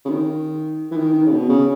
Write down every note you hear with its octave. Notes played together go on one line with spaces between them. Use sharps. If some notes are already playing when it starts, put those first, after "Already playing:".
C#3
D#3
E3
D#3
D#3
C#3
B2
C#3